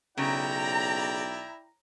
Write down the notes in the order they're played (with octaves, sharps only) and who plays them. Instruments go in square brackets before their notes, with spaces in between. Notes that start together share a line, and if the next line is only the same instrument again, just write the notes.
[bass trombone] B1 [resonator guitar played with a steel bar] C#3 [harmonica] E4 D5 G5 [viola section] A#5